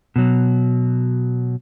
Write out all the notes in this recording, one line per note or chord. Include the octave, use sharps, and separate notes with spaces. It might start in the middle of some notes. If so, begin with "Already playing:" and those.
B2 F#3